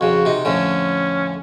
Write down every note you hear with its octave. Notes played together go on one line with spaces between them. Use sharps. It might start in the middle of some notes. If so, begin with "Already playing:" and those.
F2 C#3 F#4
C3 D#4
F2 A2 D3 C#4